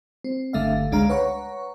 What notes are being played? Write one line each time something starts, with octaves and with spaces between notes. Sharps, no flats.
C4
G1 D3 A3 E5 F5
C#2 G#3 D4 F5 A#5
B4 C#5 F#5 A#5 C#6